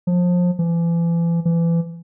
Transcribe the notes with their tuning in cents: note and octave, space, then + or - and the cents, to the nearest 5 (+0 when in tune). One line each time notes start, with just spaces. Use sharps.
F3 +25
E3 +40
E3 +30